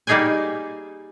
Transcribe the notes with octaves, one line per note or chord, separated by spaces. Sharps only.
G3 A#3 D#4 G#4 G5 G#5